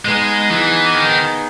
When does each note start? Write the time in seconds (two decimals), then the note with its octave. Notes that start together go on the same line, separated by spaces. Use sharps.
0.05 G#3 B3 D#4 G#4 D#5
0.50 E3
0.94 D#3